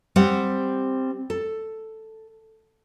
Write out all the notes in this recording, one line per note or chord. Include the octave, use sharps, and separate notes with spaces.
G3 C4 G4 F#5
A4